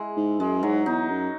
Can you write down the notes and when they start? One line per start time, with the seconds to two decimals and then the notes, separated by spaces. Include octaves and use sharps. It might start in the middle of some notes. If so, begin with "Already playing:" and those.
Already playing: G#3 E4
0.17 G#2
0.39 F#2 G#3
0.63 G#2 F#3
0.86 E2 D#4
1.09 F#2